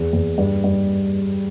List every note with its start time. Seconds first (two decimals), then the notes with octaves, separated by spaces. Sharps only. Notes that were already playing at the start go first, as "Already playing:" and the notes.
Already playing: E2
0.13 E2
0.38 G2
0.64 G2